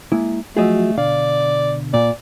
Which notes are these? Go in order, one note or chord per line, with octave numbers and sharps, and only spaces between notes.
G#3 A#3 E4
F3 F#3 A3 F#4 G#4 D#5 E5
B2 D3 D5 F5
A#2 D5